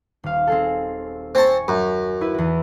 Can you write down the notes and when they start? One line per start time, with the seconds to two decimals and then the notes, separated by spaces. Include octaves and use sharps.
0.24 D#1 F5
0.47 C4 G#4 A4
1.35 C4 G#5 A5 C#6
1.68 F#2
2.21 E4 B4
2.34 E2 F#4